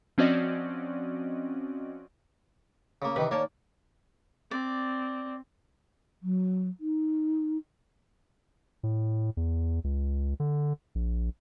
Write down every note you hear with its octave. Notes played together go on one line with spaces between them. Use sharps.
F3 C4 C#4 F#4 D5 D#5
C#3 A#3
C3 D#3 E3 B4
D#3 A#3 C#5 D5 A5
C4 D5
F#3
D#4
A2
E2
C#2
D3
A#1